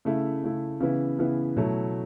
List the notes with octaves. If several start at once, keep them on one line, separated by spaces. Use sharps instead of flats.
C#3 A3 E4
C#3 A3 E4
C#3 E3 B3 E4
C#3 E3 B3 E4
B2 F#3 A3 E4